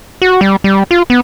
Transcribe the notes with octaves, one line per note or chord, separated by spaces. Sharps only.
F#4
G3
G3
F4
B3